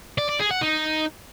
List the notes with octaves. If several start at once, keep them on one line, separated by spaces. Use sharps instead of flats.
D5
D5
G#4
F#5
D#4